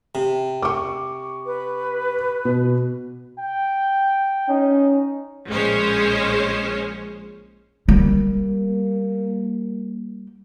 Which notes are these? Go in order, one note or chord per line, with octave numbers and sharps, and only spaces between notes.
C3
C#6 D6
B4
B2
G5
C#4 D#4
A#1 G#3 C#4 C5 C#5
G3 A#3